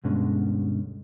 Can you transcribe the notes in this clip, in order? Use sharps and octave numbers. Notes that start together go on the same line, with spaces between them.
D2 G2 B2 D3 G#3 C#4